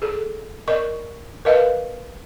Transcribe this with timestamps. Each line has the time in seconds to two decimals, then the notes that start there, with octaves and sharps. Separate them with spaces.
0.02 G#4 A4
0.68 A#4 D5 D#5 C#6
1.45 A#4 B4 D#5 F5